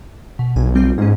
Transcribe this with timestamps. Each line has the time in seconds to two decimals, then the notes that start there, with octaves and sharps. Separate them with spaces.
0.39 B2
0.56 B1 G#5
0.75 G3 C4 F4
0.98 G#2 A#3 C#4